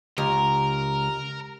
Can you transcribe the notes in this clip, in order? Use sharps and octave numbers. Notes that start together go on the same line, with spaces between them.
C#2 G4 A#4 A#5